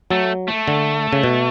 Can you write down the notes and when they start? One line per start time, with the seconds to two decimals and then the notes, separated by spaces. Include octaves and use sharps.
0.11 F#3 A3
0.48 A3
0.68 D3
1.13 C#3
1.24 B2